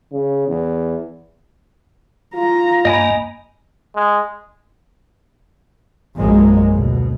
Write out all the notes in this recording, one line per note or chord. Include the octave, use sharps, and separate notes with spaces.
C#3
E2
F4 A#5
G2 A#3 D#5 G#5 B5
G#3
A#1 F#2 F#3 G#3 A#3
D2 B2